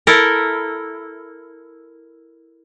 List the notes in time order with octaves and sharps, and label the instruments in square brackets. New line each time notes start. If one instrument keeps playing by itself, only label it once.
[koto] E4 A4 A#4